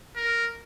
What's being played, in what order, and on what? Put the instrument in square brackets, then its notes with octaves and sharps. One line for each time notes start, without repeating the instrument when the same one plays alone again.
[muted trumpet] A#4